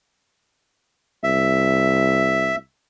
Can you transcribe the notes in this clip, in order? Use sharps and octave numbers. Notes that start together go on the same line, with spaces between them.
C2 E5